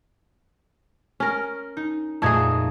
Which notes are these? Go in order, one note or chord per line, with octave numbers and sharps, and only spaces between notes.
C#4 A#4
D#4
F2 A#2 A3 D#4 G#4 G#6